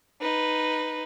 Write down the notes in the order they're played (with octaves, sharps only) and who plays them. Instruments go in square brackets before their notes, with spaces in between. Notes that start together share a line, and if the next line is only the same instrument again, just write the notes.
[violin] D#4 B4